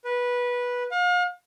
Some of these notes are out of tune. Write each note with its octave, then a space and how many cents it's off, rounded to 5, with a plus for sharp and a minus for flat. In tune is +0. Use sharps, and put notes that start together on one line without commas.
B4 -15
F5 +40